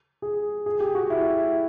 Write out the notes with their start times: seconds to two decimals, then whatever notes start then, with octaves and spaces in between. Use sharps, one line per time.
0.22 G#4
0.66 G#4
0.80 G4
0.95 F#4
1.10 E4